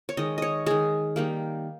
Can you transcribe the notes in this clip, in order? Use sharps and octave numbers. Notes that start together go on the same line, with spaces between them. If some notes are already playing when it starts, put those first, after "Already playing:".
C#5
D#3 G#3 D#5
C#5 D#5
D#3 G#3 G#4
D#3 G3 A#3